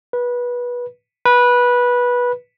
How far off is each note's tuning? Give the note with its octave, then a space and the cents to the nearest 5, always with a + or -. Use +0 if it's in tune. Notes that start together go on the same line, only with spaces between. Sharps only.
B4 -20
B4 -15